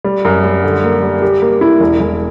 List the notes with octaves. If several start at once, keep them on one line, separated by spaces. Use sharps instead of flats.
G3
F#2
G3
D3
A#3
G3
G4
A#3
E4
E1
E1